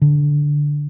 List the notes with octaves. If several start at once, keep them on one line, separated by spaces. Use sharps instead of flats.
D3